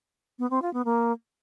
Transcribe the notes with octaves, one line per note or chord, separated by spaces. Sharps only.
B3
C4
F4
B3
A#3